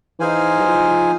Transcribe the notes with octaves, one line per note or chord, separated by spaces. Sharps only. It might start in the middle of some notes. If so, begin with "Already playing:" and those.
E3 D#4 G#4 C5 F5 G#5
F#3
F3
F3